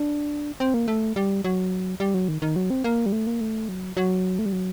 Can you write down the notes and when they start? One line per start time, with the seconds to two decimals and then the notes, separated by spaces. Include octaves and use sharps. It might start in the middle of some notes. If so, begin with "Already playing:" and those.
Already playing: D4
0.60 C4
0.74 A#3
0.88 A3
1.16 G3
1.44 F#3
2.00 G3
2.14 F#3
2.28 D#3
2.42 D#3
2.56 F#3
2.70 C4
2.84 A#3
3.06 G3
3.12 A3
3.27 A#3
3.41 A3
3.69 F#3
3.97 F#3
4.39 A3
4.46 G3
4.52 F#3